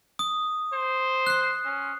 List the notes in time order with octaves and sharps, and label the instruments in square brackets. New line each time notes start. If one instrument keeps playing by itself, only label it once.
[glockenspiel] D#6
[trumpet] C5
[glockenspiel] F#6 C7
[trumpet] C#4